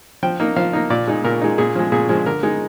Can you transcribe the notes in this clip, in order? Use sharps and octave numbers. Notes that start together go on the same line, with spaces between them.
F3 G5
A#3 D#4
F3 F5
A#3 D#4
A#2 D5
G#3 D#4
A#2 A#4
G#3 D#4
A#2 G#4
F3 G#3
A#2 G#4
F3 G#3
D3 A#4
G#3 D#4